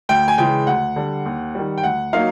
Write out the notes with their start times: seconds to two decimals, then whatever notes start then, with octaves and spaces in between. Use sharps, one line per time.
0.09 D2 G5
0.28 G#5
0.38 C#3 E3 G#3 G5
0.67 D2 F#5
0.96 D3 G3
1.26 D#2
1.55 D#3 G3
1.78 G5
1.84 D2 F#5
2.13 F#3 A#3 D#4 F5